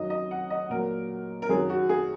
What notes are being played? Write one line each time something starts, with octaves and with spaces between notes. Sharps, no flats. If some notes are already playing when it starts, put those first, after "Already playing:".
Already playing: F#2 D#3 F#3 D#5
D#5
F#5
D#5
A#2 F#3 A#4
A#4
F#2 D#3 F#3 G#4
F#4
G#4